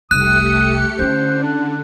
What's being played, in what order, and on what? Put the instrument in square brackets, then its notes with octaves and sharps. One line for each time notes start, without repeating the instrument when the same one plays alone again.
[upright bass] F1 C2 [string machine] A3 G4 C#7 [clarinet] D#6 [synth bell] F#6
[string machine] D3 [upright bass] C#4 E4 [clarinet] C5
[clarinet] D4